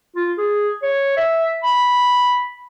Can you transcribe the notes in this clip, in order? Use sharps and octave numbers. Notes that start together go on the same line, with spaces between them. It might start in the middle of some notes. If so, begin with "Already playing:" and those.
F4
G#4
C#5
E5
B5